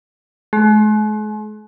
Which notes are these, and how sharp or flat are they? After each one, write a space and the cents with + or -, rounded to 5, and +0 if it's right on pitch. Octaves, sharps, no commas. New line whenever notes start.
G#3 +45